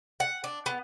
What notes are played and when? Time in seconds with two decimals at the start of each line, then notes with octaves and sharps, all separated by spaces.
0.20 F#5
0.44 D4
0.66 B3